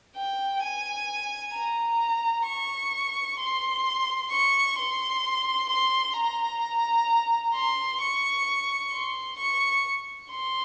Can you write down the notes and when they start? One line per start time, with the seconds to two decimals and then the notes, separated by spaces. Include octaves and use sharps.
0.16 G5
0.63 G#5
1.54 A#5
2.46 C#6
3.39 C6
4.31 C#6
4.77 C6
5.69 C6
6.16 A#5
7.54 C6
8.01 C#6
8.92 C6
9.38 C#6
10.31 C6